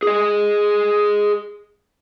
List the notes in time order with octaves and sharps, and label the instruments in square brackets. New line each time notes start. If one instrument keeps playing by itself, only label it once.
[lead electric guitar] G#4 D#5